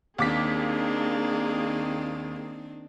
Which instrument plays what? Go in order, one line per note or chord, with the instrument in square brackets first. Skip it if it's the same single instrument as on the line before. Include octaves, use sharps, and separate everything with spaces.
[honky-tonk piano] D#2 D6 B6 [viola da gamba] D#3 C4 D4 [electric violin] A#3 G#4